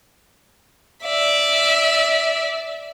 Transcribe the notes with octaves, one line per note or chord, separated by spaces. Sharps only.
D5 E5